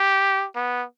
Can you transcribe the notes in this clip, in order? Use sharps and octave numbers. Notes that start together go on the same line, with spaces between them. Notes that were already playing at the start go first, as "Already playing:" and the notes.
Already playing: G4
B3